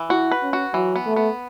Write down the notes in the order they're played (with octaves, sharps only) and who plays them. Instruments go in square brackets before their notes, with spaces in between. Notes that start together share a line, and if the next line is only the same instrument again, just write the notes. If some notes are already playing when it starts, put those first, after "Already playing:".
Already playing: [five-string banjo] E3
[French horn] E4 [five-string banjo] F#4
[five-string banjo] B4
[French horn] C#4
[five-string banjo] F#4
[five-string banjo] E3 [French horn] F#3
[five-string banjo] B3
[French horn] A3
[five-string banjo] B3